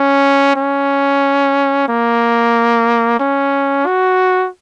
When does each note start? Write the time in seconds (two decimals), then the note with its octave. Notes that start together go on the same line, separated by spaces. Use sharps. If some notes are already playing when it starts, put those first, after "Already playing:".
Already playing: C#4
0.56 C#4
1.88 A#3
3.20 C#4
3.86 F#4